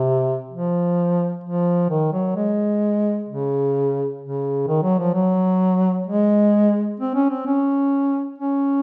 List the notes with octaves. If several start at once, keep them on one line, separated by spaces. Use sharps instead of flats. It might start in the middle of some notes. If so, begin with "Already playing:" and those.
Already playing: C3
F3
F3
D#3
F#3
G#3
C#3
C#3
D#3
F#3
F3
F#3
G#3
C4
C#4
C4
C#4
C#4